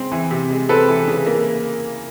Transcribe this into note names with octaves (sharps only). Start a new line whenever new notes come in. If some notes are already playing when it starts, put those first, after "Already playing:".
Already playing: C#3 G#3 C4
E3
C3
G#3
C4 A4 B4
E3
C#3
A#3